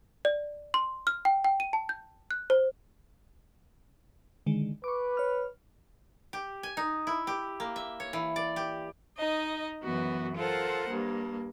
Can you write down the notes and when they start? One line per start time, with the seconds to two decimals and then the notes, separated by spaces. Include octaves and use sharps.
0.25 D5
0.74 C6
1.07 F6
1.25 G5
1.45 G5
1.60 D#7
1.73 A5
1.89 G6
2.31 F#6
2.50 C5
4.46 D3 D#3 G#3
4.84 B4 C#6 D6
5.17 C#5 F6
6.33 G4
6.63 G#5
6.77 D#4
7.07 E4
7.27 G4
7.60 A#3
7.76 E5
8.00 C#5
8.13 E3
8.36 D5
8.56 G4
9.18 D#4 D#5
9.83 F#2 E3 B3 F#4
10.37 F4 A4 A#4 C5 F#5
10.90 G2 A#3